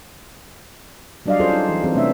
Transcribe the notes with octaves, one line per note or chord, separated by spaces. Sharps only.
F#3 G3 D4 D5 D#5 F5
C#4 F4 G#4 A4 C5
D#4
E3
E3 C4 G#4
C3 A3 C#4 D4 E5